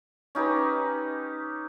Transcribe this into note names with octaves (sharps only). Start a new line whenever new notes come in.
C#4 D#4 G4 B4